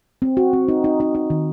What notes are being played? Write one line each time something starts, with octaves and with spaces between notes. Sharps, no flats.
C4
F#4
C4
D#4
D#4
D#4
D#4
D#3